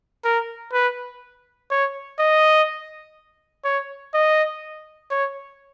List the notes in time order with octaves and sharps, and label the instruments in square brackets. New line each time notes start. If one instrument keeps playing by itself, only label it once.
[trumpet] A#4
B4
C#5
D#5
C#5
D#5
C#5